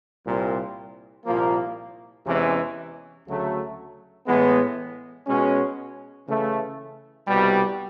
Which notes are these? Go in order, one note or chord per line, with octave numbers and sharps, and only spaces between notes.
C2 A#2 G3 C4
C2 A#2 F3 A#3
E2 C3 E3 G#3 C#4
D2 C#3 F#3 A3
A2 E3 G#3 B3
B2 G#3 C#4
C#3 E3 A3
C2 B2 G3